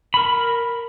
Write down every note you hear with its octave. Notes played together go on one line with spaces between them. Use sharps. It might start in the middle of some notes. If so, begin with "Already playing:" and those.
A#4 B5